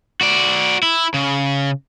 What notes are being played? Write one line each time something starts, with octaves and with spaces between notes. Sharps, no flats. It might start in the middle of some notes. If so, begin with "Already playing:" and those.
F#4 D5
E4
C#3